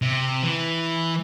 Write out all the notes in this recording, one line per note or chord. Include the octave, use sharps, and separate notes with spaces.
C3
E3